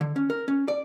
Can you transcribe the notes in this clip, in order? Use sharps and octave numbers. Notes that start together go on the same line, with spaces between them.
D3
C#4
A#4
C#4
D5